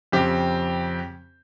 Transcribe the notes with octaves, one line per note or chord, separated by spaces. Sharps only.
F2 C#3 C4 G4